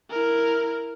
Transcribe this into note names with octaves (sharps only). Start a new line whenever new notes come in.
E4 A#4